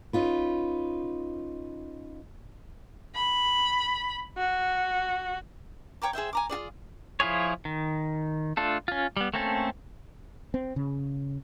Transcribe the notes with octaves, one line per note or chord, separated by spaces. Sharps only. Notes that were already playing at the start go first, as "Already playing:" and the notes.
C#4 D#4 F4 B4
B5
F#4
C#5 G5 A#5 D6
G#4 C5 E5 G5
G#5 A#5 D6
F4 F#4 G#4 D5
F3 E4 F4 G#4 C#5
D#3
A3 D4 F4 A4
C#4 F4
G3 B3
A3 A#3 C4 C#4 A4
C4
C#3